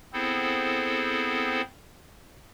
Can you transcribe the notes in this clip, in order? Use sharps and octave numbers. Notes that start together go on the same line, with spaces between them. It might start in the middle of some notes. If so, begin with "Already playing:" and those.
B3 C4 E4 G#4 A4 C5